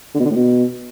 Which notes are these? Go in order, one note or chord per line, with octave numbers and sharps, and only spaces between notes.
D3
B2
D3
A2
B2